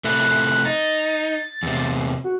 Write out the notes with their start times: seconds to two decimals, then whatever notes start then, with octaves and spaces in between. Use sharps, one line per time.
0.04 C3 A3 E4 F#6
0.65 D#4 A6
1.63 E2 C3
2.24 F#4